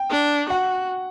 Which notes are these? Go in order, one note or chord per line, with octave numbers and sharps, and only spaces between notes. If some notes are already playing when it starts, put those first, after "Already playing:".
Already playing: G5
D4
F#4 F#5